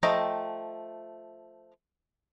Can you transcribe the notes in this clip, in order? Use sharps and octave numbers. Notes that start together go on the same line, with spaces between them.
F3 A3 D#5 G5 A#5